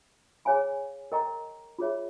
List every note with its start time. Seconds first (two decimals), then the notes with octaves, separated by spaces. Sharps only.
0.45 G#4 C#5 F5 G#5 B5
1.12 A#4 D#5 G5 A#5 C#6
1.78 F4 G#4 C#5 E5